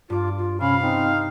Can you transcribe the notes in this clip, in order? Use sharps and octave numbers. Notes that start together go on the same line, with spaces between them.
G2 F4 D6
F4
C3 C#4 F5 B5
C4 D#4